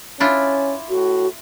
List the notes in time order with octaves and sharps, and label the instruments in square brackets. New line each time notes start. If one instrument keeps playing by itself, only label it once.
[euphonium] C#4 [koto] D4 E4 F4
[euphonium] A2 [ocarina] F#4